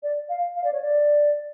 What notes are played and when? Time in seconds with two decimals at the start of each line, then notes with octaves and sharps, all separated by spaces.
0.03 D5
0.29 F5
0.56 F5
0.64 D5
0.72 C#5
0.82 D5